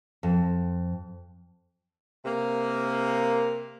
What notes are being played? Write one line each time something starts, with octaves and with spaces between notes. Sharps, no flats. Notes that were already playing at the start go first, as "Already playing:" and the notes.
F2
C3 A#3